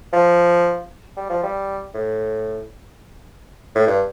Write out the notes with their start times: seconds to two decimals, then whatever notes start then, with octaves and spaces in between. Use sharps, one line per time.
0.13 F3
1.17 G3
1.29 F3
1.43 G3
1.94 A2
3.75 A2
3.87 G2